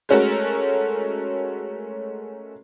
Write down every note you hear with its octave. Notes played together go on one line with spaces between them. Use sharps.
G#3 A3 C#4 F#4 A4 A#4